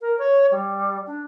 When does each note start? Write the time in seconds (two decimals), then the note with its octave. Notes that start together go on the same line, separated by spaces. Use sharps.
0.01 A#4
0.19 C#5
0.51 G3
1.07 D4